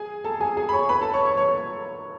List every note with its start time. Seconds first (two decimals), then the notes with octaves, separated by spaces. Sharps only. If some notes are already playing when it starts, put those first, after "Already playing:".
Already playing: G#4 G#5
0.24 A4 A5
0.41 G#4 G#5
0.57 G#4 G#5
0.69 B5
0.73 C#5 C#6
0.89 B4 B5
1.01 A4 A5
1.14 C#5 C#6
1.25 C#5 C#6
1.37 C#5 C#6